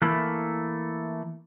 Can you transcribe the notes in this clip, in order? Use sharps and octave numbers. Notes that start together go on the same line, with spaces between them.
E3 A3 A#3 E4